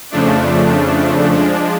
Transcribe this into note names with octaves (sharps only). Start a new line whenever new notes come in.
F2 C#3 F3 A3 D4
F3 G#3 D4